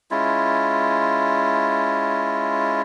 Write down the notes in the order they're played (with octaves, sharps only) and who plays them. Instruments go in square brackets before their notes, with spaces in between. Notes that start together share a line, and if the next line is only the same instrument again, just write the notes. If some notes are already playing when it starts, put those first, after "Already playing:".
[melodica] G#3 C#4 E4 F4